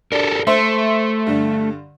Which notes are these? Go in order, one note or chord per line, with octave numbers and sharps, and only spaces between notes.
D4 G4 A4 A#4
A3 C5 E5
G2 D3